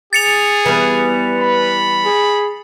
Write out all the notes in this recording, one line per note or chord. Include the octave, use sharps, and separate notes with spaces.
G#4 A6 C#7 F7
E3 G3 B3 B4
B5
G#4